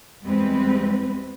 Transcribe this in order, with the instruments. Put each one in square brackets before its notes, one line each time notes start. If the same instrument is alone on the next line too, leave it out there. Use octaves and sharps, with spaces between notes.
[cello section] E2 G3 G#3 C4 B4